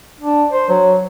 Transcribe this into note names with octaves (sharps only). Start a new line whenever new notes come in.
D4
C5
F#3